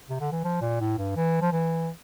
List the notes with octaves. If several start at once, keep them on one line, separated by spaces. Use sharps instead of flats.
C3
D3
E3
F3
A#2
A2
G2
E3
F3
E3